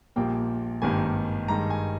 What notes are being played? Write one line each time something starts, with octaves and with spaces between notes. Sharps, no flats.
A#1 A#2 G3 A#3 G5
G#1 G2 D#3 G3 A#3 G#5
G2 D#3 G#3 A#5
G#5